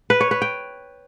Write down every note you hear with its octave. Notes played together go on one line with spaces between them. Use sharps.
B4
C#5
B4
G5